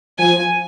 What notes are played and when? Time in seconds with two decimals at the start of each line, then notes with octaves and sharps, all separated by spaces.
0.18 F3 G#5